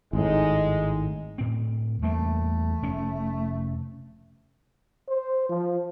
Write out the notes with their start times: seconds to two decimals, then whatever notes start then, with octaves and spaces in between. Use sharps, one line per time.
0.13 G#1 A2 G#3 D#4
1.38 A2 C4
2.02 E2 G3 A3 A#3
2.82 F1 C#4
5.09 C5
5.49 F3